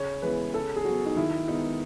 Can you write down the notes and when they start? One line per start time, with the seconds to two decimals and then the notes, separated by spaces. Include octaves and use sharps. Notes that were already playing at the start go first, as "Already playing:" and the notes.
Already playing: C#3 C#5
0.22 E3 G#3 B3 B4
0.54 C#3 A4
0.76 G#4
0.85 F#3 B3 F#4
1.06 D#4
1.16 D#3 E4
1.48 G#3 B3 D#4